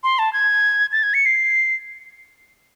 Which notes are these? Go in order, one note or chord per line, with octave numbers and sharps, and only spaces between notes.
C6
A5
G#6
A6
G#6
C#7
C7